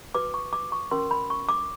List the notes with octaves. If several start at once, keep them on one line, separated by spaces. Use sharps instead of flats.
F#4 B4 D6
C#6
D6
C#6
C#4 F#4 A#4 C6
B5
C#6
D6